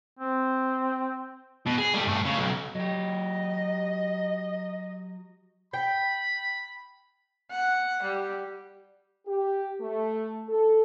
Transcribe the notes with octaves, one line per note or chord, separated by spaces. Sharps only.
C4
B2
G#4
G3 A3
G2 A3
C#3
B1
F#3 G4 D#5
G5 B5
F#5
G3
G4
A3
A4